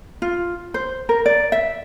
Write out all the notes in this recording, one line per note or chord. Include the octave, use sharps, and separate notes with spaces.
F4
C5
A#4
D5
E5